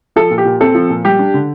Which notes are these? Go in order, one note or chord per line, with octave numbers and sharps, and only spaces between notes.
F3 A4
A#2
G4
A#2
C4 A4
F3
A#2
G3 G4
D4
D3